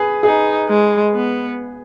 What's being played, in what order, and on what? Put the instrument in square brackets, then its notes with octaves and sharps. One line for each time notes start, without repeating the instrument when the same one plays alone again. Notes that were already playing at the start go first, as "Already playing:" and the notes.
Already playing: [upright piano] G#4 B4
[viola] D#4 [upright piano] G#4
[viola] G#3
B3